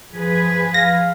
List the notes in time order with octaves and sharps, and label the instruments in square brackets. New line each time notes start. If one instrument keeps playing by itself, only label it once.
[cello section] F3 G#4 B4
[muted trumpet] F5 [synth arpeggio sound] A#6